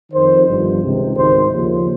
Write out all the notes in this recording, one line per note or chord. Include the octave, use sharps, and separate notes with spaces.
F2 D#3 C5
G1 G2 F3
C#2 C3 D#3
G#1 G#2 D#3 C5
D#2 C#3 F3